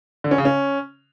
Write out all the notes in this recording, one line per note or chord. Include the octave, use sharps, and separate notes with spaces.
D3
C#4
C#3
C#4